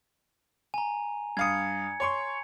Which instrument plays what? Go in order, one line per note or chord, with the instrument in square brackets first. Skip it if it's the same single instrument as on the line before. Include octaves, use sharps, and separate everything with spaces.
[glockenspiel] G#5 A#5
[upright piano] G2 F5 D#6 [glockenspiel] G#6 C#7
[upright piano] C#5 C6 C#6